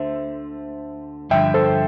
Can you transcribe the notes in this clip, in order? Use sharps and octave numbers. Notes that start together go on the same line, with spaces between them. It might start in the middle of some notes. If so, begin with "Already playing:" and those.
Already playing: D2 D3 A3 C5 E5
G2 D3 F3 E5 G5
A4 C5